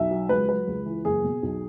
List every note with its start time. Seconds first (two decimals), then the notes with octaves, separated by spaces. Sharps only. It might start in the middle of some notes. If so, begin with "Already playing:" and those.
Already playing: B1 E5
0.11 F#3
0.29 C#2 B4
0.48 F#3 B4
0.67 C#2
0.86 E3
1.05 F#1 G#4
1.24 B2
1.43 B1